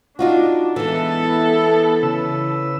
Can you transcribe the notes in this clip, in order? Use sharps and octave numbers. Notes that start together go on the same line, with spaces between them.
D4 D#4 F4 F#4
E3 G#3 B3 E4 A4
C#3 B4 E6